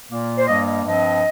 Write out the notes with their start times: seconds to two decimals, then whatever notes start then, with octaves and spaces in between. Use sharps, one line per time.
0.10 A#2 A#3
0.37 C5
0.47 G2 G3 A#3 D#5
0.66 D#5
0.84 G2 F3 C4 D#5